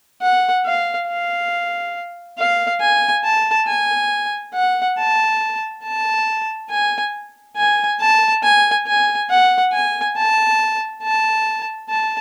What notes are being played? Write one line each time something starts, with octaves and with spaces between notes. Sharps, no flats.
F#5
F5
F5
F5
G#5
A5
G#5
F#5
A5
A5
G#5
G#5
A5
G#5
G#5
F#5
G#5
A5
A5
A5